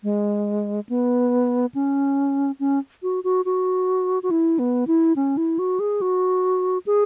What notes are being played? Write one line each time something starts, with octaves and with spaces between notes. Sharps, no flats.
G#3
B3
C#4
C#4
F#4
F#4
F#4
F#4
E4
B3
E4
C#4
E4
F#4
G#4
F#4
G#4